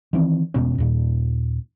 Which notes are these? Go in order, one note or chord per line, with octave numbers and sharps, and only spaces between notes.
D#3 E3 C4
E1 B2 C#4
D#2 A#2